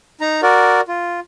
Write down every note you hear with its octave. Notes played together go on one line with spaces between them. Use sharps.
D#4 A#5
F#4 A#4 D5
F4